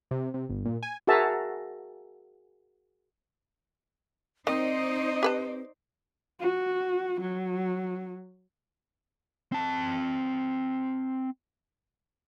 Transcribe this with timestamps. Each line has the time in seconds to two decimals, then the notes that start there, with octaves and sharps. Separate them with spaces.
0.11 C3
0.34 C3
0.49 G1
0.65 A#2
0.83 G#5
1.07 F#4 G#4 A#4 E5 A5 A#5
4.47 D#3 C4 D#4 C5 D5 D#5
5.23 G4 B4 A5
6.40 F#4
7.21 F#3
9.52 C4 A5